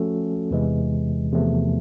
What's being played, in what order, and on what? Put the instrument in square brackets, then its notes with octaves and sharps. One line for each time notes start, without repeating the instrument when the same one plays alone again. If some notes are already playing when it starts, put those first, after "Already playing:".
Already playing: [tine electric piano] F3 A3 C#4 F#4 A4
E2 C3 E3 G#3
E2 C3 F3 A3